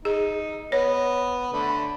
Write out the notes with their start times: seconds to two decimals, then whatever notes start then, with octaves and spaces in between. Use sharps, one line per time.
0.05 D#4 G#4
0.72 B3 C#5
1.53 D3 A3 B5